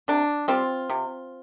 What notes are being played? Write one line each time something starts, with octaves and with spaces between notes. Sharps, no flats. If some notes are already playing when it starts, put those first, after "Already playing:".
C3 D4
G3 C4 F4
C3